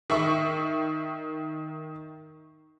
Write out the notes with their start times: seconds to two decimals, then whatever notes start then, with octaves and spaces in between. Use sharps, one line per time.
0.10 D#3 E5 C#6